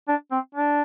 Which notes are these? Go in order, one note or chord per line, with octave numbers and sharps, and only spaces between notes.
D4
C4
D4